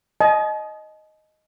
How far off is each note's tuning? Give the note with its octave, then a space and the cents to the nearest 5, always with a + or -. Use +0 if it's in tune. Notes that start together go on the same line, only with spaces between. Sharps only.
D#5 +0 A5 -45